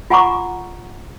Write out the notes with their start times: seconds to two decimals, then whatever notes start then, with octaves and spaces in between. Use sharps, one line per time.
0.10 F4 F#5 G#5 A#5 C#6 D6